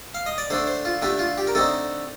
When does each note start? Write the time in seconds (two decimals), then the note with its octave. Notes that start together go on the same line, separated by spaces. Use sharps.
0.15 F5
0.26 D#5
0.38 D5
0.50 D3 A3 D4 C5
0.67 C5
0.85 F4
1.02 D3 A3 D4 G4
1.19 F4
1.38 G4
1.47 A#4
1.55 D3 A3 C4 D#4 A4